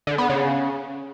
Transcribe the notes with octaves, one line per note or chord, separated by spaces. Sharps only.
D3
B3
C#3